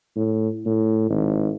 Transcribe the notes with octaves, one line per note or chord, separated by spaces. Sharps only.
A2
A2
G#1